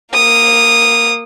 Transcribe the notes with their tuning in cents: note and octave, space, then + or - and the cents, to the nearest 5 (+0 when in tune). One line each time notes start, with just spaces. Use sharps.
A#3 +0 D#6 -10